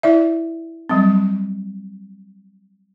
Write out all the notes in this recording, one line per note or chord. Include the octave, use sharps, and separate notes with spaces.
E4 D5 E5
F#3 G3 C4